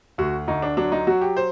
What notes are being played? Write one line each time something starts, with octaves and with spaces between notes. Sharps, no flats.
D2 F#4
D2 D#4
D4
F#3 D4
D#4
F#3 F#4
G4
C5